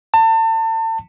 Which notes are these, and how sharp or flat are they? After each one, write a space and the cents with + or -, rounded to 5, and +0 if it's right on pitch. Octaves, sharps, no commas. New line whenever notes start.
A5 +35